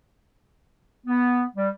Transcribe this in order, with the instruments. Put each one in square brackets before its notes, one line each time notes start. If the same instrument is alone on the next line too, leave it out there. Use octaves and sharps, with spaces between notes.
[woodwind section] B3
G3